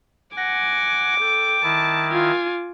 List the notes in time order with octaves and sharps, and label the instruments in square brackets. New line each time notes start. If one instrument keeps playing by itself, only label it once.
[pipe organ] F#5 A#6 [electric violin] G#5 [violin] D6
[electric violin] A4 [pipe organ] G5
[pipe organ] D#3 E4 [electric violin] A5
[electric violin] F4 G#5